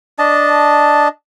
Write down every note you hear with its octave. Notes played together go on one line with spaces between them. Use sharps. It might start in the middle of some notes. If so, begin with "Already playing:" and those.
D4 D#5 A5